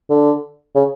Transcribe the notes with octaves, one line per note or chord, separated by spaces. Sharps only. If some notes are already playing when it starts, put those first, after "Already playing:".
D3
C#3